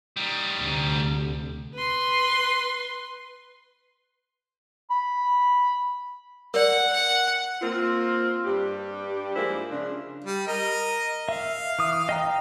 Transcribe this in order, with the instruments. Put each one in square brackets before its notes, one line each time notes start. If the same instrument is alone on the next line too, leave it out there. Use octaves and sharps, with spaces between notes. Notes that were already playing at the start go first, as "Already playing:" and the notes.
[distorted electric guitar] G3 D#4
[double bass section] D2 C3
[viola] B4 C6
[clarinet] B5
[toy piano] A#4 D5 [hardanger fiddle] F#5
[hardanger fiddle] F#5
[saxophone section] A#3 C4 F4
G2 G3 G4
F3 G#3 A#3 E4 C5 D5
C#3 F3 D4
[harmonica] G3
A#4 D#5
[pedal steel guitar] E5 [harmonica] F5
[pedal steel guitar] E3 D#6
D#5 G5 A#5